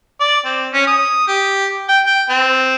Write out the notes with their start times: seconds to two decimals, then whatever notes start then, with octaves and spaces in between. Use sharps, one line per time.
0.20 D5
0.45 C4
0.73 C#4
0.87 D#6
1.28 G4
1.89 G5
2.06 G5
2.29 C4